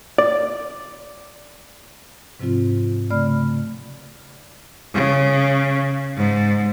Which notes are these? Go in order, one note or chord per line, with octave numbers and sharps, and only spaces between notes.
D5
G#2 C3 F3 C4 F4
C#3 A3 D5 B5 F6
C#3
G#2